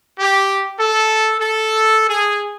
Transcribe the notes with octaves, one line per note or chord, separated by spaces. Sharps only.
G4
A4
A4
G#4